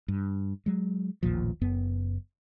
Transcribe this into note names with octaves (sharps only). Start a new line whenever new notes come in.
G2
F#3 G#3
A1 D#2 A#2 F3
F#1 F#2 B3